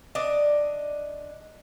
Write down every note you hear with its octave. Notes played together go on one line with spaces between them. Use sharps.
D4 D#5